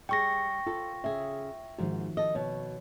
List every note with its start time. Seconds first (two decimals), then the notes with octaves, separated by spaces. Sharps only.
0.09 G3 G#4 G5 C#6 A#6
0.67 F4 A4
1.04 C#3 G#4 E5
1.79 G#2 D#3 F3 F#4
2.17 A4 D#5
2.35 B2 C#5